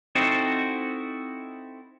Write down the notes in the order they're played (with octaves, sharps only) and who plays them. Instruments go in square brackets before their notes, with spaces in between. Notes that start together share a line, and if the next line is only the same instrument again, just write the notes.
[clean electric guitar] C4 D#4 E4 F#4 A4 C5